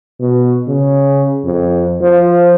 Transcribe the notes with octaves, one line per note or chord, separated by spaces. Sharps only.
B2
C#3
F2
F3